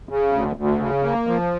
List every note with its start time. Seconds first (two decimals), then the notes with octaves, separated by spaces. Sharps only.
0.09 C#3
0.32 D2
0.56 D2
0.79 C#3
1.03 A#3
1.27 F3